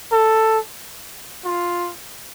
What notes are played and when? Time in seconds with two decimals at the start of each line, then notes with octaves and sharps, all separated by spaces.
0.12 A4
1.45 F4